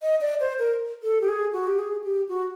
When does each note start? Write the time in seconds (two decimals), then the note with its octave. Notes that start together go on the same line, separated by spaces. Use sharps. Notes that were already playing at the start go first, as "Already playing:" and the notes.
0.02 D#5
0.21 D5
0.40 C5
0.59 A#4
1.03 A4
1.21 G4
1.28 G#4
1.53 F#4
1.67 G4
1.79 G#4
2.04 G4
2.29 F#4